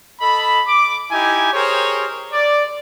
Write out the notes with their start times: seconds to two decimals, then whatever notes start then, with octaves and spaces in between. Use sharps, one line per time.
0.20 A4 D#5 B5
0.67 D6
1.11 D#4 E4 G4 G#5
1.52 G4 G#4 A#4 C5 C#5
2.32 D5